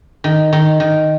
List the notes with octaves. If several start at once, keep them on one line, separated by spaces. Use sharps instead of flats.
D#3
D#3
D#3